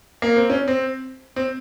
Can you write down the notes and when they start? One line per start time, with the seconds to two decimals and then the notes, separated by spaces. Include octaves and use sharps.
0.22 A#3
0.36 C4
0.50 C#4
0.68 C4
1.36 C4